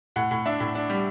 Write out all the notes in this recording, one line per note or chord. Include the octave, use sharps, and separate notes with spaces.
A2 F#5
A2
D4 E5
A2
D4
G3